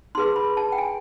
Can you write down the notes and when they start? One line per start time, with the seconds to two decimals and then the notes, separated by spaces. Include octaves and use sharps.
0.15 D#4 G#4 B4 C6
0.36 B5
0.57 A5
0.72 G5
0.78 G#5